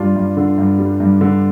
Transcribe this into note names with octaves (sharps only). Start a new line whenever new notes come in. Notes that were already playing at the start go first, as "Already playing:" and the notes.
Already playing: G2 G3 D4 F4
G2
D3
G2
G3
G2
D3